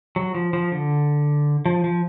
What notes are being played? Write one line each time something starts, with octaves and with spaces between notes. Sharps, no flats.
F#3
F3
F3
D3
F3
F3